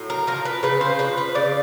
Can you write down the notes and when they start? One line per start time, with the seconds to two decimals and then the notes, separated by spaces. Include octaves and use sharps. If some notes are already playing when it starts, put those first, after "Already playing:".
Already playing: A2 F#3
0.10 A#4
0.27 F3 A#4
0.45 B4
0.63 C#3 B4
0.81 C5
0.99 F3 B4
1.18 B4
1.35 C#3 D5